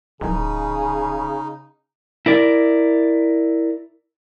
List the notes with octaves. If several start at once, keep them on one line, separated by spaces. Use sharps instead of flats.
D1 C#3 D#4 G#4
E4 A#4 D5